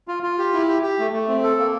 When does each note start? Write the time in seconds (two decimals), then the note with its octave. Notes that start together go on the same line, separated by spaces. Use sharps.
0.08 F4
0.23 F4
0.38 G4
0.53 E4
0.68 G4
0.83 G4
0.99 A3
1.13 A3
1.28 C4
1.43 A4
1.59 A#3